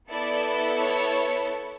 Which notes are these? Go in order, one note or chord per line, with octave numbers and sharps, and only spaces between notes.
B3 E4 A4 D5
C#5